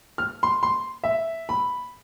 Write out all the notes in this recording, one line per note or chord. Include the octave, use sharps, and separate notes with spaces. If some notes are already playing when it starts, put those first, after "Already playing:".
F6
C6
C6
E5
B5